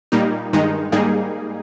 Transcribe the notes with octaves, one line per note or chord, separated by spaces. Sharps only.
A#2 G3 A#3 D#4
G2 D#3 G#3 D#4
G#2 G3 A#3 D#4 G#4